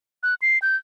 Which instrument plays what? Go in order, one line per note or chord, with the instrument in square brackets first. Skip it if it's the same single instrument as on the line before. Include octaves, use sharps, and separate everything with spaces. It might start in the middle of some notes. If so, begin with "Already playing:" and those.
[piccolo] F#6
C7
G6